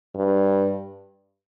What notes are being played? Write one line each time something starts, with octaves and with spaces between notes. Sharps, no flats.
G2